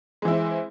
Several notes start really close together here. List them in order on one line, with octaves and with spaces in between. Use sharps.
G#3 E3 E4 C4